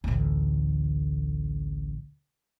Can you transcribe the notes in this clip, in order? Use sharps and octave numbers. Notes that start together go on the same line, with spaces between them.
A1 D2